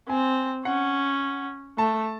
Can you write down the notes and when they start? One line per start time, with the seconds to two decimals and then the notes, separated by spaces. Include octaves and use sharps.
0.09 C4 G#5
0.65 C#4 F#5
1.78 A3 A5